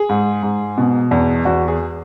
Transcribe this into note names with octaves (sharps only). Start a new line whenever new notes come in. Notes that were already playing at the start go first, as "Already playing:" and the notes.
Already playing: G#4
G#2
G#2
B2
E2
E2 F#4
G#4